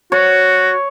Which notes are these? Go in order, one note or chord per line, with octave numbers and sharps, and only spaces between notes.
F#4 C#5